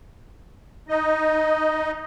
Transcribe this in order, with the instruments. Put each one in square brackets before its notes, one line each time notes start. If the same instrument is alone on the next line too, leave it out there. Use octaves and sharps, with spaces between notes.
[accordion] D#4 D#5